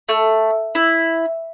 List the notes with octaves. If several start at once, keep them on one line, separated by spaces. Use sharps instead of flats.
A3
E4